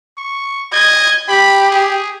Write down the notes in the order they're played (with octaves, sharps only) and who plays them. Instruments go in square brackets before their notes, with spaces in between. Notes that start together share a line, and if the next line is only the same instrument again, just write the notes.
[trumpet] C#6
[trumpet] D#5 [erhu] G#6
[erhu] G4 [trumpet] B5
[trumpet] G#4